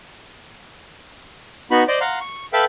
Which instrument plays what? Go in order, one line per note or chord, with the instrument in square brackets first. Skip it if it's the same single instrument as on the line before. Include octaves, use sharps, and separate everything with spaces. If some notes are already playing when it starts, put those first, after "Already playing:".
[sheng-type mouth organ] B3 D#4 F#4 B5
C5 D5 D#5 D6
F5 F#5 A#5 C6
C#6
A4 B4 E5 F5 G5